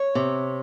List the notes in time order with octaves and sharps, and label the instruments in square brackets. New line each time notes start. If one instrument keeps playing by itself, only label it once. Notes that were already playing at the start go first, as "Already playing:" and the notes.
Already playing: [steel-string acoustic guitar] C#5
C3